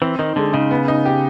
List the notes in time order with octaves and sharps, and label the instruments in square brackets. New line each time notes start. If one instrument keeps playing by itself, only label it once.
[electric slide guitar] E3 [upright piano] C4
[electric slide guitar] D#3 [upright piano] D#4
[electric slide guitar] D3 [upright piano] G#3
[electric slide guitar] C#3 [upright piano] D#4
[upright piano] B3
D#4
G4